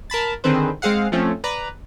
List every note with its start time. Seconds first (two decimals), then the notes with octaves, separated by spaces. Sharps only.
0.10 A#4 A5 B5 A6
0.44 D3 D#3 C4 G#4 B4 C5
0.82 G#3 C4 G#4 F5 F#5
1.12 F3 A3 C4 C#4
1.44 B4 D5 A#5